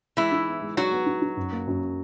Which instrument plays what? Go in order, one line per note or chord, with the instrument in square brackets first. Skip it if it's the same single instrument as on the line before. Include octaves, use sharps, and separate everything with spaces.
[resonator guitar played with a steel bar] E3 E4 [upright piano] G#3
[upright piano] D#4
B3
G#3
[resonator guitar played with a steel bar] F#3 F#4 [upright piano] D#4
[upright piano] B3
D#4
D#4
F#2
A#3
F#2